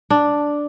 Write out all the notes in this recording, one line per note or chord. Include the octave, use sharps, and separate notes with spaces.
D4